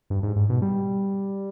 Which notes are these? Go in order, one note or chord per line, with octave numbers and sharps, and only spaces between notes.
G2
G#2
G#2
B2
G3